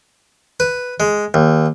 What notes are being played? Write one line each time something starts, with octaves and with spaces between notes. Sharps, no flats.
B4
G#3
D#2